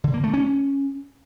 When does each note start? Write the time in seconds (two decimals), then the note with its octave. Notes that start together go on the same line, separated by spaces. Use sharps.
0.04 D3
0.14 A#3
0.24 A3
0.34 C#4